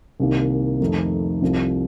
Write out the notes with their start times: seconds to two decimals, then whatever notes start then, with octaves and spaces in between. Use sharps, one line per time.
0.20 C2 C3 D#3 A#3
0.81 F2 D#3 A3 D#4
1.42 C2 C3 F3